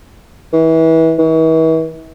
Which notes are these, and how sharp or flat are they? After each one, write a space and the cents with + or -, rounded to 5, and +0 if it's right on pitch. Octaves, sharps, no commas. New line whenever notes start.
E3 -30
E3 -40